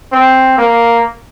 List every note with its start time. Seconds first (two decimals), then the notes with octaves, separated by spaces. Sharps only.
0.12 C4
0.58 A#3